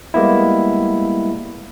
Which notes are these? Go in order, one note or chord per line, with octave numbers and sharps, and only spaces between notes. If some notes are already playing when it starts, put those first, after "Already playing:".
G3 G#3 A#3 B3 E4